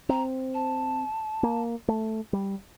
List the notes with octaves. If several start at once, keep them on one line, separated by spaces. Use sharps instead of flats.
C4 A#5
A5
A#3
A3
G3